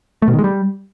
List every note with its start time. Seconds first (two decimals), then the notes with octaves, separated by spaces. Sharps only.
0.22 A3
0.28 B2
0.33 D#3
0.39 G#3
0.44 G3